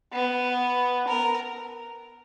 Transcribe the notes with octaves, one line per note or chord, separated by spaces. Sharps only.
B3
A#4